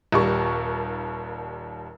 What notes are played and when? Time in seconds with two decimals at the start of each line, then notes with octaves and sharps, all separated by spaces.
0.12 D#1 D#2 G3 C#6